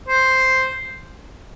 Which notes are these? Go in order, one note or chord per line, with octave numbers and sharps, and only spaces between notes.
C5